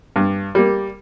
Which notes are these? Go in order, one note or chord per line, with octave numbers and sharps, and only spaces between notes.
G2
G3 A#3